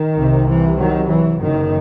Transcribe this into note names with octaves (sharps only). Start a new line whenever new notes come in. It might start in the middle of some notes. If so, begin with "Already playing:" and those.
Already playing: D#3
C2 C3
E3
D#3 F#3
E3
F#1 F#2 D#3